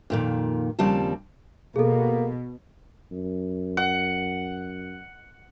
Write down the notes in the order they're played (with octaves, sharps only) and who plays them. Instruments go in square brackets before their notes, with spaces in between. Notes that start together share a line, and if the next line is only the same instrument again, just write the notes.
[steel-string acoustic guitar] F2 A#2 D#3
D#2 C#3 F3 G3 C4 A5
[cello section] B2 [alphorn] A#3 [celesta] G#4 A4
[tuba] F#2
[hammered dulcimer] F#5